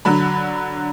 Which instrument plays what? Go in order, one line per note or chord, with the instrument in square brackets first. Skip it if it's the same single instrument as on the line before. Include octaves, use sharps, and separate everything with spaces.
[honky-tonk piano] D3 F#3 B5